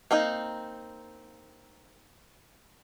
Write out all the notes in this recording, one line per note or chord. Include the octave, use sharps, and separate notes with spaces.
A#3 C4 D#4 D#5